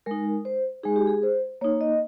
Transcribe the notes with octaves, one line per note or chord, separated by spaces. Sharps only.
G#3 D#4 A#4
C5
G#3 D#4 G#4
G4
G#4
C5
A#3 D#4 C#5
D#5